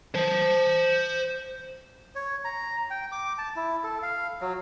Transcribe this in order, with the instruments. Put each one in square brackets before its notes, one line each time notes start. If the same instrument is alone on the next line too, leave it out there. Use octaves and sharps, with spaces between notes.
[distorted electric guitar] C5 A5
[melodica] C#5
A#5
G5
D6
A5
E4
A4
F5
F#3